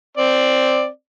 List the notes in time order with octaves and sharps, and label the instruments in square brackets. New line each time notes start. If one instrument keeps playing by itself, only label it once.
[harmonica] C4 D5